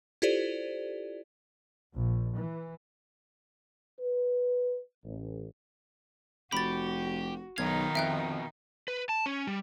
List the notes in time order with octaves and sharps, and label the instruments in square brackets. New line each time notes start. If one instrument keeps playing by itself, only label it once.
[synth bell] E4 F4 G4 A4 C5 D5
[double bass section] A#1
E3
[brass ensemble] B4
A1
[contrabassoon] F1 [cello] F#4 [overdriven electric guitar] G4 [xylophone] B5 A6
[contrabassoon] B1 [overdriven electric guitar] B2 F5 [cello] D#3 D#4 [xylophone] G#6
[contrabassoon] F2 [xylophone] E5 G5 F#6
[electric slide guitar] B4
A5
C#4
G3